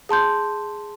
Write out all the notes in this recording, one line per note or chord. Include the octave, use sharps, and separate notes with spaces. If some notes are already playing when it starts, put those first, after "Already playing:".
G#4 A5 C6 G6